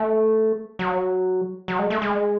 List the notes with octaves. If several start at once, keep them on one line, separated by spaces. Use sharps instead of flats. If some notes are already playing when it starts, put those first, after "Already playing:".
Already playing: A3
F#3
F#3
G#3
A3
G#3